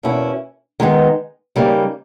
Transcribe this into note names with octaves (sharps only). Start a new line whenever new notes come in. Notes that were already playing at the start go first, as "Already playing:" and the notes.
E2 B2 A#3 C#4 E4
D#3 G#3 B3 D#4
C#3 G3 A#3 D#4